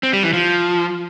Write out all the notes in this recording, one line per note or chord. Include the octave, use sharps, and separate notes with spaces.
C4
G3
E3
F3